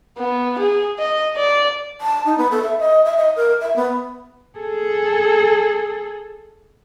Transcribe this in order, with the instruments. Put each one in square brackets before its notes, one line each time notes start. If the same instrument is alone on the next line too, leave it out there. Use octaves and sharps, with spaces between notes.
[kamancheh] B3
G#4
D#5
D5
[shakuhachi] A5
D#4
B3
A4
E5
D#5
E5
D#5
A#4
E5
B3
[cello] G#4 A4